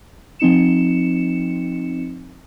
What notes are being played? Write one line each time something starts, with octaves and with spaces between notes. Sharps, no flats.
F3 C4 D#4 C#7 E7